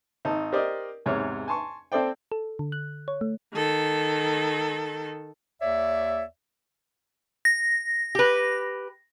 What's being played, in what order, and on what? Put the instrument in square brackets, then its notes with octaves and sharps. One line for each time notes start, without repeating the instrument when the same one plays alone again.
[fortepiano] G#1 D#4 A5
G4 A#4 C5 D5 D#5
E2 G#2 C3 C#5 F6
G#5 A5 C6 C#6
C4 A4 C5 D5 G5
[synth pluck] A4
D3
F#6
C#5
A3
[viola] D#3 A4
[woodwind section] D#2 C#5 D5 E5
[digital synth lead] A#6
[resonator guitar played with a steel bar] G4 B4